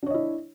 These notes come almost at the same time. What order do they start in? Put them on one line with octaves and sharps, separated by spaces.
D4 C#5 D#5 E4